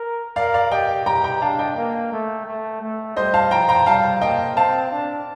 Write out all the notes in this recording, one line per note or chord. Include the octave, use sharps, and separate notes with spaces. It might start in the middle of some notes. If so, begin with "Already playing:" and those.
Already playing: A#4
A#4 D5 F5
D5 F5
G4 D#5 G5
G4 G5 A#5
G5 A#5
D4 F5 A5
D#5 G5
A#3
A3
A3
A3
G3 C5 D#5
F5 A5
F3 G5 A#5
G5 A#5
G3 F5 A5
A#3 D#5 G5
C4 F5 A5
D4